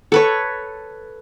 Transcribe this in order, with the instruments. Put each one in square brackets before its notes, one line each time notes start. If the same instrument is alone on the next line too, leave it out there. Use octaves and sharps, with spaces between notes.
[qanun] A4 B4 C#5